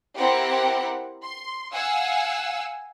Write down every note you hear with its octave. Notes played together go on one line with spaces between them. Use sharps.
C4 E4 G4 A#4 F#5
C6
F5 F#5 G#5 E6